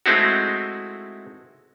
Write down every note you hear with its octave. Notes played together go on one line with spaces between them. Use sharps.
G#3 A3 C4 D#4 E4 F#4